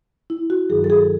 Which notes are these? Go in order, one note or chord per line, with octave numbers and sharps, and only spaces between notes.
E4
F#4
G2 D#3 F#3 G#4
A4
G#4